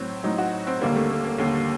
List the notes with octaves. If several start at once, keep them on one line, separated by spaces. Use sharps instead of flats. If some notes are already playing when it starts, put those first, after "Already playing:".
Already playing: A2 F#3 C4
A2 F#3 D#4
F#4
C4
D#2 D3 G3 A#3
A3
A#3
A#3
D#2 D3 G3